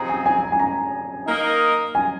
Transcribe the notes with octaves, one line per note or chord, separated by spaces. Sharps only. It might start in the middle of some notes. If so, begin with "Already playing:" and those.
Already playing: C3 F3 C4 D#4 G#4 A#5
G#5
G#5
A#5
G#5
A#5
A#3 D#4 A#4 D#5
G#5